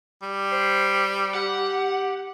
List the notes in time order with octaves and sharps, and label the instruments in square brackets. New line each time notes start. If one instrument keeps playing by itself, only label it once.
[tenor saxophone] G3
[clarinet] C5
[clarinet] G4 [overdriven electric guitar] F#5